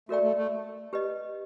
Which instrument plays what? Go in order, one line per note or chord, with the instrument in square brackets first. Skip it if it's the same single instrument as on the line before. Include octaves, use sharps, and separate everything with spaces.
[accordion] A3 [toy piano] F#4 A#4 D5 G5
[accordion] A3
A3
[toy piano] G4 B4 D#5